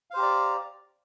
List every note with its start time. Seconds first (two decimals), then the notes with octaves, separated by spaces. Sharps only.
0.11 F5
0.14 C5
0.17 G4
0.20 A#5
0.23 D5